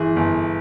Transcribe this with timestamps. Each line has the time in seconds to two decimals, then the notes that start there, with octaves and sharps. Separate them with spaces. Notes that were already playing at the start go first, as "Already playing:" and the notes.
Already playing: G1 E3 G#4
0.16 G1